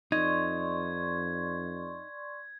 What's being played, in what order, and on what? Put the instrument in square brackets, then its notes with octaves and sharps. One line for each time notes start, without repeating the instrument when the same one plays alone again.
[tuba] F2 [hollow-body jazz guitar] D#4 [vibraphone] D5 C6 C#6 [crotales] G#6